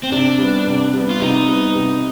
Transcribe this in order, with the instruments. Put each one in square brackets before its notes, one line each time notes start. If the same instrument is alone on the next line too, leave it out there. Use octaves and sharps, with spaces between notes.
[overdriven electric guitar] C4
[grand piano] C3 [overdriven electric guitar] D4
[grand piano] G3 B3
C3
G3 B3
[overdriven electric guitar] F4
[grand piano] C3 [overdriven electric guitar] D#4
[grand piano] G3 B3
C3